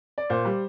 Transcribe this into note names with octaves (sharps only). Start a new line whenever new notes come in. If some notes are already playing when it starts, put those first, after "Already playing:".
D5
A#2 C5
G3